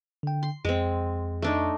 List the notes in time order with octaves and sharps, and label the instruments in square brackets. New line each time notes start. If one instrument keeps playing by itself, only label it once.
[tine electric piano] D3 G5
[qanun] C6
[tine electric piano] F2 [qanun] G#3 C4
[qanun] A3 D4 D#4